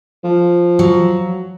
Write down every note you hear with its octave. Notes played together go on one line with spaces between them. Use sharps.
F3
F#3